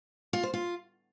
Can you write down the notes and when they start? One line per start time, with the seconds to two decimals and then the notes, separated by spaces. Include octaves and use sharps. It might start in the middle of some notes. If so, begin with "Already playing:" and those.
0.33 F4
0.43 C5
0.53 F4